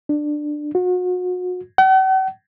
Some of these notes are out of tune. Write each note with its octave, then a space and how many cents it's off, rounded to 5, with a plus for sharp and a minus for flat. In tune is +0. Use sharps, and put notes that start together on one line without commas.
D4 +15
F#4 -35
F#5 +45